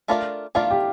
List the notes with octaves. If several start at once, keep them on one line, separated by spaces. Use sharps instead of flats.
A3 D4 F4 A#4 D5
A3 D4 F4 A#4 D5 F5
G4